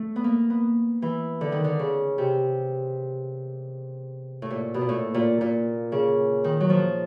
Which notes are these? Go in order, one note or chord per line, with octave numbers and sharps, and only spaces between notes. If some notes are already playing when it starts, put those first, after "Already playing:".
Already playing: A3
B3
A#3
B3
E3
D3
D#3
D3
C#3
C3
A2
A#2
B2
A#2
A2
A#2
A#2
C#3
D#3
F#3
F3